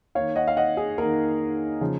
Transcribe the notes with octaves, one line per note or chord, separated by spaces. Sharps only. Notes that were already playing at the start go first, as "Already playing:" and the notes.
D#3 A#3 C#5 F5
D#5 F#5
F5
D#5 F#5
G#4
D#3 A#3 A#4
C#3 F3